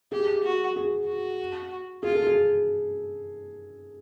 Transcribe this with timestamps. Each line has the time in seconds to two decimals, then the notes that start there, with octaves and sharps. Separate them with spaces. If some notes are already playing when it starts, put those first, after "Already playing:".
0.12 G4 G#4
0.44 F#4
0.76 G#4
1.07 F#4
2.03 F4 G#4
2.15 A4
2.27 G#4